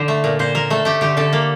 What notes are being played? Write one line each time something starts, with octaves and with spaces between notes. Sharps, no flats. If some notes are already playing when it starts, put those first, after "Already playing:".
Already playing: D3 C5
A3
A#2
A#2 C5
A#2 A#4
A3 A4
A3 G4
D3 G4
D3 A4
A#3